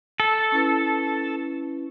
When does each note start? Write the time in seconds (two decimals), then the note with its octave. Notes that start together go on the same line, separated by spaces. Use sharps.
0.20 A4
0.52 C#4 E4 B4